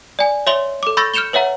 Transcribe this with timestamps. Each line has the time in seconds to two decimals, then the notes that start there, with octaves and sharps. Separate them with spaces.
0.19 D5 G#5
0.47 C#5 E5 C6 F7 G7
0.83 A4 D6
0.97 B5 C#6 E6 G6 A6 A#6
1.14 F6 G6 C#7 E7 F7 G7
1.33 B4 C#5 E5 F#5 A#5